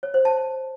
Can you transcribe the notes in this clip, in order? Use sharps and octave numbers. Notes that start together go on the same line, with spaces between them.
C#5
C5
A5